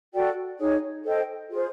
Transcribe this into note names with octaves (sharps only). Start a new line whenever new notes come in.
F#4 A4 D5 G5
D#4 G#4 C#5
A4 C5 D#5 G5
F4 G#4 C5